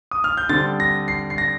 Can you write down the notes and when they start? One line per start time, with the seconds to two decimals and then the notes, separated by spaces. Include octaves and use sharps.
0.11 D#6
0.24 F6
0.37 G6
0.49 D3 G3 C4 A6
0.80 A#6
1.08 C7
1.30 C7
1.38 A#6